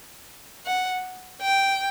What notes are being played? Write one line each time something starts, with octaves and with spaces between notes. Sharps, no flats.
F#5
G5